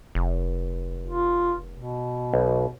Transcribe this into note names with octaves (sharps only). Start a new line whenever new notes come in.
F1
F4
B2
B1